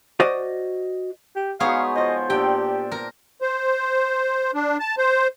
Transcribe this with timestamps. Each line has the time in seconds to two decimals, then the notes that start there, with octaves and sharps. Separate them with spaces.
0.20 F#4 C5 D5 D#5
1.36 G4
1.60 G#3 B3 D#4 F#4 G#4 C#5 F5
1.96 F3 F4 C5 D#5
2.30 A#2 D4 G4 E5 G5
2.92 A#4
3.42 C5
4.54 D4
4.80 A5
4.98 C5